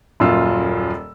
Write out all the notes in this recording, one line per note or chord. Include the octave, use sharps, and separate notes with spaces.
D#1 F#2 A#2 F4 E6